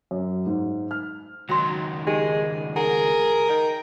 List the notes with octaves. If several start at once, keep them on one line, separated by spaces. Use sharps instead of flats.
F#2
G#2
F6
C#2 D#3 F#3 G5 C6
G#3 D#4 G4 G5
G#4 A#4 F#5 A#5
D#3 G5